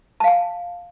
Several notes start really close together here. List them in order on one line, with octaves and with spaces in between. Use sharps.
A5 F5 G#5